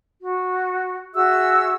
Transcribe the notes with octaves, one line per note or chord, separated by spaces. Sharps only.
F#4
F#4 G#4 E5 E6